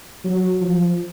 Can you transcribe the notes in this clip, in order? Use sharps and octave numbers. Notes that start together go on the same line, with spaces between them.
F#3
F3